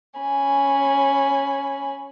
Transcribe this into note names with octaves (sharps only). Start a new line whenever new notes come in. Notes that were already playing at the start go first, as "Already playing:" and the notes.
C#4 G#5 B5